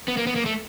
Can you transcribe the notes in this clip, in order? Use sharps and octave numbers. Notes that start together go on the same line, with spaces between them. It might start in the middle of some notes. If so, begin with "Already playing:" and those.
B3
A#3
B3
A#3
A3